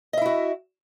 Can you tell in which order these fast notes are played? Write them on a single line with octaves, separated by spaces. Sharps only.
D#5 E5 E4 F#4